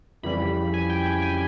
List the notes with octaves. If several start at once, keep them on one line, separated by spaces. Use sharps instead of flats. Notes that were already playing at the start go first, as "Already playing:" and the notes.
F2 C#3 E3 G3 B5
G#5
G5
G5
G#5